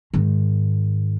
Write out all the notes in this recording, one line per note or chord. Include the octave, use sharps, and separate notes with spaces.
G#2 D#3